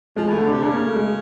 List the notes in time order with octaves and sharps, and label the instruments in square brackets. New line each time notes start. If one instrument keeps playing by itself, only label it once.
[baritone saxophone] F3 [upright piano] G#3
[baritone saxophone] E3 [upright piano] A3
[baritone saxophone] D3
[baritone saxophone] C3 [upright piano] D4
[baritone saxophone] C#3 [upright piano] D4
[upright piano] A#3
A3
G#3